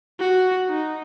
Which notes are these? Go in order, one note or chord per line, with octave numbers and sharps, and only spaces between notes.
F#4
D#4